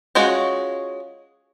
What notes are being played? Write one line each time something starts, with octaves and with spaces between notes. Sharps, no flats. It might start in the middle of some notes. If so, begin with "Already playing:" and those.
G#3 C#4 F4 F#4 C#5